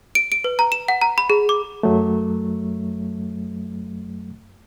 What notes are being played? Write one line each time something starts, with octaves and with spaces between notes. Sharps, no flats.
D7
D7
B4
A#5
E7
F#5
A#5
B5
G#4
D6
F#2 F#3 A3